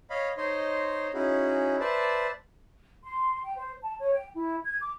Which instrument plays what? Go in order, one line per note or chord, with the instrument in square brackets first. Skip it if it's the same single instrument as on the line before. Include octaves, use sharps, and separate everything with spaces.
[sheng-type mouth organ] C#5 D#5 F5 B5
D#4 C5 C#5 D#5 C6
C#4 D#4 E4 F#4 G#4
B4 C5 D5 E5 A5
[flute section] C6
G5
C5
A5
C#5
G5
E4
G#6
D6